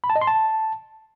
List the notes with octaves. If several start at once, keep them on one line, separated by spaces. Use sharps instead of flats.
B5
A5
D#5
C6
A5